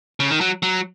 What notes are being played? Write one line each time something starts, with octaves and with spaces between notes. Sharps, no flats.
C#3
D#3
F#3
F#3